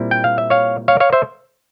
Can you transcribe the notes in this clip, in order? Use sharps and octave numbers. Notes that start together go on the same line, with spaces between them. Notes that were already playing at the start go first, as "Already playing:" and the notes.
Already playing: A#2 G3 C4 E4
G5
F5
E5
C#5 F5
C#5 F5
C#5 F5
C5 E5